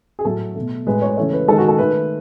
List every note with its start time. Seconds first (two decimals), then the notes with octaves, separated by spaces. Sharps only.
0.19 G#4
0.25 A2 F#3 A3 A4
0.55 B2 A3
0.87 A2 G#3 B4
1.02 C#5
1.17 C#3 E3 A3 C#5
1.33 B4
1.48 D#3 G#3 A4
1.58 F#4
1.68 A4
1.78 D#3 A3 B4